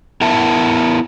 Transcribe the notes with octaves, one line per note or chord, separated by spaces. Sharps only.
B3 E4 A#4 E5 A5